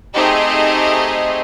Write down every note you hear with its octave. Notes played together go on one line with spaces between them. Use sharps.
A3 C4 D#4 G4 G#4 D#5